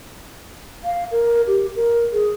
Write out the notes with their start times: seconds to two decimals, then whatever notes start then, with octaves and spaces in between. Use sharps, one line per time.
0.84 F5
1.11 A#4
1.47 G4
1.76 A#4
2.13 G#4